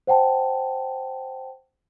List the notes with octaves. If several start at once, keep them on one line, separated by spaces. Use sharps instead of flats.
C5 F#5 G5 A5